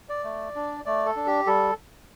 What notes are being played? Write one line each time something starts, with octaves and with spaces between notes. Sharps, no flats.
D5
A3
D4
A3 D5
A4
D4
G4
G3 A4